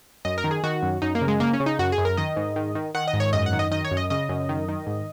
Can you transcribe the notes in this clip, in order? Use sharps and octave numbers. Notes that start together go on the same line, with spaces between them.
F#2 D#5
A#4
D#3
G#4
D#3 F#4
F#2
F#2 D#4
A#3
C#3
G#3
C#3 A#3
C#4
C#3
D#4
F#2 F#4
G#4
F#2
A#4
D#3 D#5
G#2
D#3
D#3
D#3 F#5
D#5
G#2
C#5
F#2 D#5
F#5
D#3
D#5
D#3 D#5
C#5
F#2
D#5
C#3 D#5
F#2
D#3
D#3
G#2